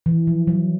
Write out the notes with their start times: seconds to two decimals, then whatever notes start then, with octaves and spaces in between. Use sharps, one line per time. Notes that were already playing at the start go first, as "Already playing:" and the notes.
0.06 E3
0.27 F3
0.47 F#3